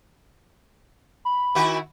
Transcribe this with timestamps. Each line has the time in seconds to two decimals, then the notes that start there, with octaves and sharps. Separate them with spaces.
1.25 B5
1.55 D#3 E4 F#4